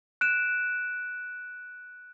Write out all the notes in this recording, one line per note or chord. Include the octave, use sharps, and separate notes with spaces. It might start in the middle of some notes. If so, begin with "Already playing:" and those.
F#6 D7 E7